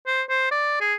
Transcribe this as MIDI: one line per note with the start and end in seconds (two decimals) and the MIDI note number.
0.07 0.22 72
0.29 0.48 72
0.51 0.77 74
0.81 0.95 68